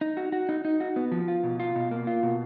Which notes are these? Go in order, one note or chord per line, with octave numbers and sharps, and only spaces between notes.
D#4
F#4
F#4
D#4
D#4
F#4
B3
F3
F4
B2
F4
B2
A#3
F4
B2